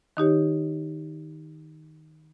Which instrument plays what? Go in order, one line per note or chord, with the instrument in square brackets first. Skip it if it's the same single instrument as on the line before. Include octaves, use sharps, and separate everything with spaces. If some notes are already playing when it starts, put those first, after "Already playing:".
[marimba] D#3 D#4 G4 C#5